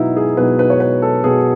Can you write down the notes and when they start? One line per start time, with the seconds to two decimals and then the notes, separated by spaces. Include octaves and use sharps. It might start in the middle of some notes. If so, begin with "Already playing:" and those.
Already playing: B2 F#3 B3 D#4 E4
0.17 G#4
0.37 B2 F#3 B3 B4
0.59 B4
0.70 C#5
0.80 B4
1.02 A4
1.24 B2 F#3 B3 G#4